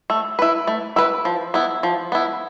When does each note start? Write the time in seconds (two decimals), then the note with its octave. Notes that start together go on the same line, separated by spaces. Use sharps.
0.10 A3
0.39 E4 B4
0.67 A3
0.96 E4 B4
1.25 F3
1.54 B3 E4
1.83 F3
2.12 B3 E4